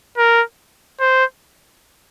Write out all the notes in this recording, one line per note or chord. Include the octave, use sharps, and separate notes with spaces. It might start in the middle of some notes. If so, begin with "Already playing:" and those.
A#4
C5